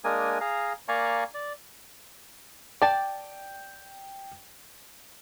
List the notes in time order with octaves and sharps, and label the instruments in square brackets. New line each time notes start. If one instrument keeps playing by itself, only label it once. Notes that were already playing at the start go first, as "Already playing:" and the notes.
[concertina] G#3 A#3 D4 A#4 G#5 D#6
G#4 F5 A#5
A#3 D5 F5 G#5 A#5 C#6
D5
[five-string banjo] D5 A5 [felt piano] G5